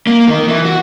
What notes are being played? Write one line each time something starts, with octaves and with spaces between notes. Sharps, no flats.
A#3
D#3
E3
F#4